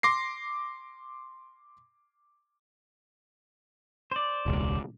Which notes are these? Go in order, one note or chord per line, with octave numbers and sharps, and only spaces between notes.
C6 D6 A#6 C7
C5 D5
E1 C#2